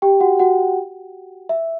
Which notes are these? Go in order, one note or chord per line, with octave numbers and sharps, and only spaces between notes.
G4 G5
F#4 F#5
F#4 F#5
E5